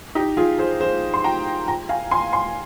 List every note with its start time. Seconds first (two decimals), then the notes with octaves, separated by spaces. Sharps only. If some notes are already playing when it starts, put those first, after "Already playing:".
0.15 D#4 G4
0.37 F4 G#4
0.59 G#4 C5
0.81 G#4 C5
1.14 C6
1.24 G5 A#5
1.68 G5 A#5
1.89 F5 G#5
2.11 G#5 C6
2.33 G#5 C6